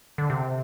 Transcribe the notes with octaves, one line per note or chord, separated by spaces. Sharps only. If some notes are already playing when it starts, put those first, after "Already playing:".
D3
C3